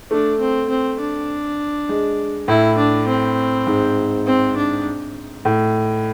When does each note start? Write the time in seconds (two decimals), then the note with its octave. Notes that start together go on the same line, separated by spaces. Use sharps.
0.11 A3 D4
0.40 C4
0.69 C4
1.00 D4
1.89 G#3
2.48 A2 E4
2.78 D4
3.08 C4
3.67 G#2
4.26 C4
4.56 D4
5.45 A2